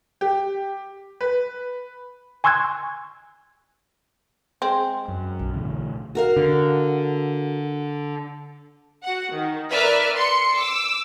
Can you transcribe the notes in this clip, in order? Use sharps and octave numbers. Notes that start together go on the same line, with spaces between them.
G4
B4
G#5 C6 C#6 E6 F#6 G#6
G#3 C4
F#2
B1
A2 D3 E3
F#4 A#4 F5
D3
F#4 F#5
D#3
A#4 B4 D5 E5 F6
C6 C7 C#7
D6 E6